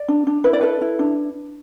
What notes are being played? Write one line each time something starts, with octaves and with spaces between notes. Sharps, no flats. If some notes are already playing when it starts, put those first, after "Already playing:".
Already playing: D5
D4
D4
E4 B4
D5
A4 B4
E4
D4